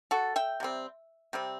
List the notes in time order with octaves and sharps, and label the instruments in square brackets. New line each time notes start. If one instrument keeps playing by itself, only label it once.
[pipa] F#4 A4
E5 G5
C3 G3 C4
C3 G3 C4